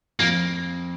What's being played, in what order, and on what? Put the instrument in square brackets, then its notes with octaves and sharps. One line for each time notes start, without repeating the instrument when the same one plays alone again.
[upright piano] F2 [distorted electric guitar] A#3